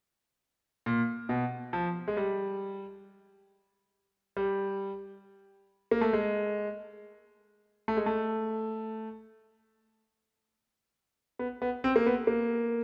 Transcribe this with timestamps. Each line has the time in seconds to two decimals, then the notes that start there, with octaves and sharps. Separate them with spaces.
0.86 A#2
1.29 B2
1.73 F3
2.08 G#3
2.17 G3
4.37 G3
5.91 A#3
6.01 A3
6.13 G#3
7.88 A3
7.97 G#3
8.06 A3
11.39 B3
11.62 B3
11.84 C4
11.96 A#3
12.06 B3
12.27 A#3